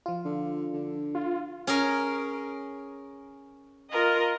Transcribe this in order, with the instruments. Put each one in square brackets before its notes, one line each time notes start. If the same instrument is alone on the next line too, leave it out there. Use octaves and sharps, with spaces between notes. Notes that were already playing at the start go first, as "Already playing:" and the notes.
[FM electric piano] F3 F4
[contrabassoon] D3
D3
[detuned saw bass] F4
[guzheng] C#4 G#4 A#4
[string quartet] F4 A#4 D#5